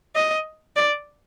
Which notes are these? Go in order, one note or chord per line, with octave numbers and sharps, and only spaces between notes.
D#5
D5